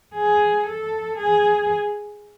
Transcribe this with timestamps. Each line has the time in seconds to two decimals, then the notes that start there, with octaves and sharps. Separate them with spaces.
0.15 G#4
0.67 A4
1.18 G#4